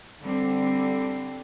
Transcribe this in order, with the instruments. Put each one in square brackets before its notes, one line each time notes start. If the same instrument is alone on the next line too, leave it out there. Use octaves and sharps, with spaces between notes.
[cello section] D3 G3 C4